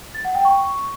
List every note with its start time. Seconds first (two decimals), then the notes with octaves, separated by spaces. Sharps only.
0.14 A6
0.25 F#5
0.35 G5
0.45 C#6